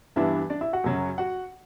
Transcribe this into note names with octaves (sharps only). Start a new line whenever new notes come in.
G2 E3 G3 B3 D4 E4 E5
D4 D5
E4 E5
F#4 F#5
F#2 C#3 F#3 C#4
F#4 F#5